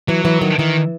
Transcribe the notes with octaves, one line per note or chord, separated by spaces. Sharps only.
E3 F#3
E3
D#3
D#3 E3